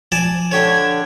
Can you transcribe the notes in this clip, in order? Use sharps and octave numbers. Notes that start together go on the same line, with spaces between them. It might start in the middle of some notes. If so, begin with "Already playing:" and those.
F3 D5 G#5 A5
D3 D4 G4 C#5 G#6